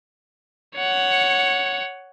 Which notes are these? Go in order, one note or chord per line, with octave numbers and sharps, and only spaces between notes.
C#5 F#5